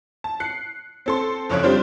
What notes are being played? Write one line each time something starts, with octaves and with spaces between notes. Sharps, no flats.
A5
F#6 C7 C#7
C4 A4 C6
F#1 F2 C#3 C#5 F#6 D7
G3 C4 D4 F4 C5